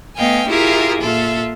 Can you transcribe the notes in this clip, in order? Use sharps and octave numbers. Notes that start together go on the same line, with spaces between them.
A3 B3 D#5 F5 G5 G#5
E4 F4 G4 G#4 A#4 E5
A#2 F4 A4 E5